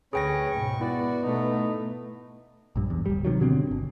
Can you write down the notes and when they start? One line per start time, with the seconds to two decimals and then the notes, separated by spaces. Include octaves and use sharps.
0.13 D2 C#4 G#4 B4 C#5 G5 A#6
0.51 G#2 B2 C#6
0.81 B3 E4 F#4 D5
1.23 B2 A3 D#4
2.76 A#1 G2
2.90 E2
3.06 D1 G3
3.25 C3 D#3 F#3
3.41 B2 D3 C4
3.71 G1